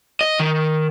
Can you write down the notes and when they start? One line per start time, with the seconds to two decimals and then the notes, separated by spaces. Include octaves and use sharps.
0.21 D#5
0.40 D#3